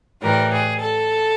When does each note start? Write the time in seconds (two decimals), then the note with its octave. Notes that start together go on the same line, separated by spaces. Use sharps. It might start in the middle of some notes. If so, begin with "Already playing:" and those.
0.22 A2 E3 G3 A#4
0.52 G#4
0.80 A4